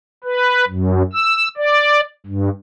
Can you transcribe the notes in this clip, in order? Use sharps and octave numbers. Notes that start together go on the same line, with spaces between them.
B4
F#2
E6
D5
G2